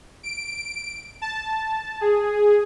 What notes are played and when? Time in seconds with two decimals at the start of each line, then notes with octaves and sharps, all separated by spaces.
0.23 D7
1.22 A5
2.01 G#4